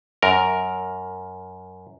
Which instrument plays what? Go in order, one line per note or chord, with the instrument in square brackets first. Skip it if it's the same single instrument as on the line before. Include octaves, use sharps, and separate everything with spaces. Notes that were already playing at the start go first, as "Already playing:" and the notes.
[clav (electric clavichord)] F#2 A#4